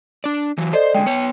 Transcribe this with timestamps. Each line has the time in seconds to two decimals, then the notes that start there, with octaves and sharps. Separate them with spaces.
0.24 D4 D5
0.58 E3 F#3
0.73 A4 C5 D5 D#5
0.94 D3 G#3 G5
1.06 B3 C#5